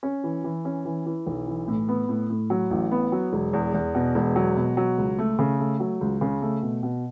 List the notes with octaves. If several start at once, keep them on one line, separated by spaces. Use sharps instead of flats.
C#4
E3
E3
C#4
E3
E3
B1
E3
A2
B3
A2
A2
F#3
A1
B3
F#3
E1
E2
E2
B2
E1
F#3
B2
F#3
C#2
A3
C#3
A3
F#3
C#2
C#3
A3
B2
B2